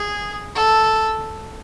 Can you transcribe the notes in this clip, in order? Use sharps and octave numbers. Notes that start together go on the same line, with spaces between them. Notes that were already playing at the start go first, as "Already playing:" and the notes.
Already playing: G#4
A4